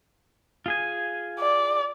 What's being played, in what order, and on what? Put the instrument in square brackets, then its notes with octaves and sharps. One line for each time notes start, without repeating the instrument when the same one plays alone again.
[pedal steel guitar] F4 G#4 G#5
[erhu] D5